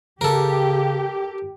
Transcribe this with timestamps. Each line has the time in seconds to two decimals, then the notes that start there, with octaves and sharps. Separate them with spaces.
0.21 C#3 G4 A4 A#4